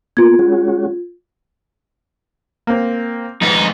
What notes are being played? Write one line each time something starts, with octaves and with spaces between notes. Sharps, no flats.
A#3 B3 F4 G#6
G#3 C#4 F#4
A#3 C4
F2 G#2 D#4 B4